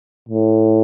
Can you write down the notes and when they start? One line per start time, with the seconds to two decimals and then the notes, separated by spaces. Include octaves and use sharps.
0.29 A2